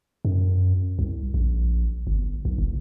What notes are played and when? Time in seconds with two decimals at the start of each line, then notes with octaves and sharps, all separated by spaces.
0.25 F#2
0.99 C2
1.34 A#1
2.07 G1
2.45 B1
2.58 F#1